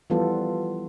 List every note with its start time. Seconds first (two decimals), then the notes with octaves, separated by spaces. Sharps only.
0.10 E3 F3 G3 B3 F4 A4